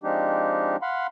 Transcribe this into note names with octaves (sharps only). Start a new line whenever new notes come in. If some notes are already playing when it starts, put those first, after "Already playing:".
F3 G#3 C4 D4 D#4 G4
F5 F#5 B5 C6